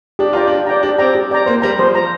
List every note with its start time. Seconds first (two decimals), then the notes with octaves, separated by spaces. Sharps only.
0.19 D4 G4
0.33 F4 D5 G5 A#5
0.47 D4 G4
0.66 D5 G5 A#5
0.83 D4 G4
0.98 C4 D5 G5 A#5
1.15 G4
1.31 D5 G5 A#5
1.46 A#3 C5
1.62 G3 A#5
1.78 F3 C5
1.95 A#5